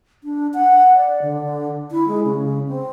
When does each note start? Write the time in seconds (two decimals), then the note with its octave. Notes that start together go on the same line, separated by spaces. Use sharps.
0.24 D4
0.54 F#5
0.96 D5
1.22 D3
1.91 E4
2.08 G#3
2.25 C#3
2.68 C4